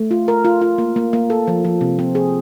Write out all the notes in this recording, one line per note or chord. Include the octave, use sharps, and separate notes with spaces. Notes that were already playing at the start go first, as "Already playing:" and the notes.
Already playing: A3
F4
A#4
F4
F4
A#3
A#3
A#3
A4
F3
F3
C3
C4
G#4